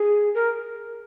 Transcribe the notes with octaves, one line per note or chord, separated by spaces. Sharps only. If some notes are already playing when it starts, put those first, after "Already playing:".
Already playing: G#4
A#4